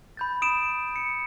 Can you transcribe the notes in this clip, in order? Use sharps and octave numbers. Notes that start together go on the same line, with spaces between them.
B5 G6 A6
D#6 D7 E7
C#7